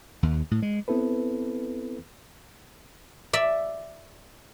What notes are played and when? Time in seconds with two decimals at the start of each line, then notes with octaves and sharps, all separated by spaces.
0.23 D#2
0.51 A2
0.62 G#3
0.88 B3 C4 E4 A4 B4
3.33 D5 E5